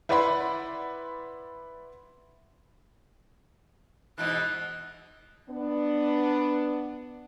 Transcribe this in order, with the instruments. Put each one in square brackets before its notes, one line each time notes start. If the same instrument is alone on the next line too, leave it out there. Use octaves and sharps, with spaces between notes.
[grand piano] E4 B4 D5 F#5 B5 C6
[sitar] G#2 B2 E3 [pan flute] F#6
[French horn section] B3 D4